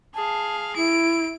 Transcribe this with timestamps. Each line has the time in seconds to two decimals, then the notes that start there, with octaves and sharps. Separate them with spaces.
0.15 G#4 F5 A5
0.76 E4 D7